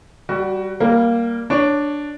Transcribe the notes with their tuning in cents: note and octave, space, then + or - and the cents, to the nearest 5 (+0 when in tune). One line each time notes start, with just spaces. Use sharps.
G3 -10 F#4 +15
G3 +0 A#3 +0
D4 +0 C#5 +10